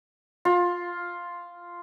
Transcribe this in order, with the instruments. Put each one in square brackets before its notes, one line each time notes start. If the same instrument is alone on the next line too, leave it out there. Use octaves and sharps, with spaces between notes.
[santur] F4